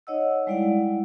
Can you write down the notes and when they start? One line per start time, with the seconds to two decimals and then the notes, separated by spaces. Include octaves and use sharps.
0.07 D#4 C#5 D#5 F#5 E6
0.47 G3 G#3 E4 D5 F5 F#5